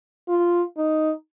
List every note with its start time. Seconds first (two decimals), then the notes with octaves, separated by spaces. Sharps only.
0.28 F4
0.77 D#4